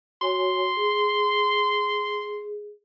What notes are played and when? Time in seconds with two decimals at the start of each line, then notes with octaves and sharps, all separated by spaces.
0.21 F#4 C#5 G#5 C6
0.76 G#4